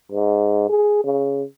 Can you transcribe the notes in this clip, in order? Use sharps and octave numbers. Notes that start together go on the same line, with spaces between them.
G#2
G#4
C#3